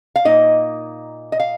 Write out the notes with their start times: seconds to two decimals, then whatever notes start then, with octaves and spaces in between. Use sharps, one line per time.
0.16 F5
0.25 A#2 A#3 D#4 D#5
1.32 D#5
1.40 F5